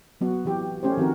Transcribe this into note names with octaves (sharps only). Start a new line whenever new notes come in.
F#3 B3 F#4
E3 G4
A3 C#4 G4 C5
D#3 F3 C4 F#4 A#4